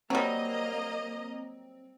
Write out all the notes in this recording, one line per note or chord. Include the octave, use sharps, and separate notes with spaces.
F#3 G3 A#3 C4 D#5 A#5